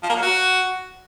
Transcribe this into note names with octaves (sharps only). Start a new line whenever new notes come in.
F3
A#3
F#3
F#4